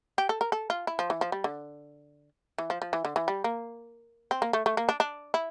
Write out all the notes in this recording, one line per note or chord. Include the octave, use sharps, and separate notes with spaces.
G4
A4
A#4
A4
F4
E4
F3
E3
F3
G3
D3
E3
F3
F3
E3
D3
E3
G3
A#3
C4
A#3
A3
A3
A#3
D4
D4
E4